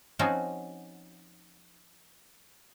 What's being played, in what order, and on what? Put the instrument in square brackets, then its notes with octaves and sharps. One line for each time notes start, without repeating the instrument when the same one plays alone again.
[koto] F3 C4 C#4 D#4 F4 F#4